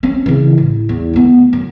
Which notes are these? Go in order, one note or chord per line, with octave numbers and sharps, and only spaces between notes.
C4 C#4
C#3 E3
A1
E2
D2 B3
F#2